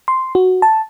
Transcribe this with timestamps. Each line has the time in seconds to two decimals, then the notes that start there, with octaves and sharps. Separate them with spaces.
0.08 C6
0.35 F#4
0.62 A5